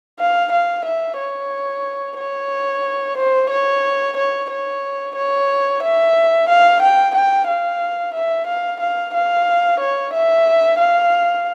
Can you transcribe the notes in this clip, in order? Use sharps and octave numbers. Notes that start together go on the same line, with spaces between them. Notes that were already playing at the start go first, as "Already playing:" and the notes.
F5
F5
E5
C#5
C#5
C5
C#5
C#5
C#5
C#5
E5
F5
G5
G5
F5
E5
F5
F5
F5
C#5
E5
F5